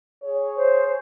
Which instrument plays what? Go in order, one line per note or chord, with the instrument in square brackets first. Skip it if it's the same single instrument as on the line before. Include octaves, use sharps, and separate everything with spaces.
[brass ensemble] G#4 C#5
[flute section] C5